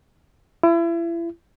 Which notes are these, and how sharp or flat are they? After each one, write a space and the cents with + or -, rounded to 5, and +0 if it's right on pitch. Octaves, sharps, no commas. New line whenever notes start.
E4 +35